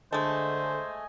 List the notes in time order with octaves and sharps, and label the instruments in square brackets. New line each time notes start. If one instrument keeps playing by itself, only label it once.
[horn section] D3 [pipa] G#3 A3 [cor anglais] C5 [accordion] D#5 G#5